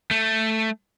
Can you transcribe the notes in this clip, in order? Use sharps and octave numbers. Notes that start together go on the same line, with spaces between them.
A3